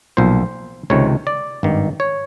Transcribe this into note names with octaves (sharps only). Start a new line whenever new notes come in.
B1 A#2 F3 C5
C#2 C3 D#3 C#5
D5
G#1 G2 D#3
C#5